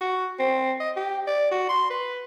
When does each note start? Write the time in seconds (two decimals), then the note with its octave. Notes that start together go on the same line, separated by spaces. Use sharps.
0.01 F#4
0.39 C4
0.80 D#5
0.96 G4
1.27 D5
1.51 F#4
1.69 C6
1.90 B4